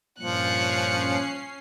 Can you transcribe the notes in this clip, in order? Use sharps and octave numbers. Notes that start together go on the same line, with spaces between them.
G2 A#2 F3 C#4 F#6 C7 C#7